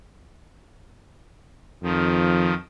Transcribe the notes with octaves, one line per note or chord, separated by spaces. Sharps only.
F2 D#3 F3